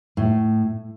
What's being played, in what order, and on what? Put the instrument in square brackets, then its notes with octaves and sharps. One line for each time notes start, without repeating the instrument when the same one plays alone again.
[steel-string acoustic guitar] A2